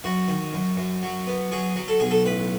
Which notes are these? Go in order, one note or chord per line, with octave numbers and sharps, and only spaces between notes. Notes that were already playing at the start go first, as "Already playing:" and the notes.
F#2 F#4
D#3
F#2
F#2
F#3
B3
F#3 G#4
F#3
A4
B1 G#4
A4
A1 B4